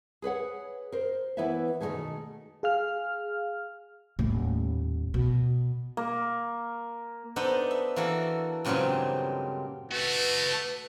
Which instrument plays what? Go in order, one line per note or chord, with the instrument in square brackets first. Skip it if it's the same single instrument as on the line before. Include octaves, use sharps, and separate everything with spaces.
[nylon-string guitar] G#4 B4 C#5 F#5
A#4 C5
E3 B3 E4 B4 C#5 E5
B2 D#3 E3 G#3 A3 G#4
[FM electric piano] G#4 F5 F6
[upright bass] D#1 A2
B2
[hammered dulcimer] A#3
[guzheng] B3 D4 D#4 A4 C5 D#5
E5
E3 A#3 F#4 A4
G2 A#2 C#3 F#3 G#3 C4
[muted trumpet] A3 [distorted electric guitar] F#4 A4 [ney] B4